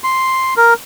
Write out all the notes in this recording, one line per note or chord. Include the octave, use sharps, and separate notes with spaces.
C6
A#4